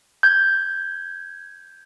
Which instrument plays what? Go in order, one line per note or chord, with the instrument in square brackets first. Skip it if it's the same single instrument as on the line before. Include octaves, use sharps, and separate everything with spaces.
[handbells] G6 G#6